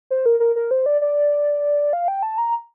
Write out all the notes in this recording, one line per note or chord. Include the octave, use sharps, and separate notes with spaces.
C5
A#4
A#4
A#4
C5
D5
D5
F5
G5
A5
A#5